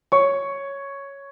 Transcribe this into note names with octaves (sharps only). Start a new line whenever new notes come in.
C#5 C#6